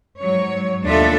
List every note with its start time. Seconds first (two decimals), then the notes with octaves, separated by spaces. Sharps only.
0.19 G#2 F#3 C#5
0.84 D#2 B2 D4 F4 A4 E5